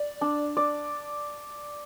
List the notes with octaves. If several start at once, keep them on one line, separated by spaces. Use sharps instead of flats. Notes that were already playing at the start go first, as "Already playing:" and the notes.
Already playing: D5
D4
D5